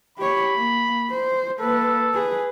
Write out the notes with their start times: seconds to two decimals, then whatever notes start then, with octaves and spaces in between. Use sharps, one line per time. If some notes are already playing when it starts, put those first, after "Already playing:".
0.18 G4 C#5 B5
0.56 A#3
1.11 C5
1.60 A#3 A4 B4
2.14 G#4 B4